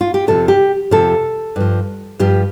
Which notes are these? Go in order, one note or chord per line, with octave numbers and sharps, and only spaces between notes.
F4
G4
F2 C3 F3 A4
G4
F2 C3 F3 A4
G2 F3
G2 F3 G4